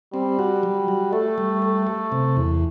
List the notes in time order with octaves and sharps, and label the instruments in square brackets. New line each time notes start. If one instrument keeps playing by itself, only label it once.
[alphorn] G3 [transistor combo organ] C4
[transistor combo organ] F#4
F#3
F#4
[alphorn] A3 [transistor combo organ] A4
[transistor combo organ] G3
A4
A4
C3
E2